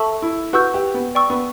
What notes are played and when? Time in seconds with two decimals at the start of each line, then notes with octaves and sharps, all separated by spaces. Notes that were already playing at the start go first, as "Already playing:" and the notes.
Already playing: A4 E5 A5 C#6 E6
0.22 E4
0.53 F#4 B4 F#5 C#6 E6 G6
0.74 G4
0.94 B3
1.15 D5 G5 C#6 E6
1.30 B3